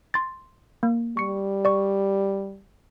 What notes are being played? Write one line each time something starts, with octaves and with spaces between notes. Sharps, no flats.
C6 A6
A#3
G3 C#6 C#7
D5 C#6